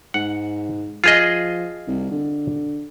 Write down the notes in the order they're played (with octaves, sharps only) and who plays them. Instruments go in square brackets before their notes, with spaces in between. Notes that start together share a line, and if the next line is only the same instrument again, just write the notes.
[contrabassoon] G#2 [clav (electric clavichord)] F#5
[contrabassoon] F3 [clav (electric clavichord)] F4 G#4 D#5
[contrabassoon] C2
D3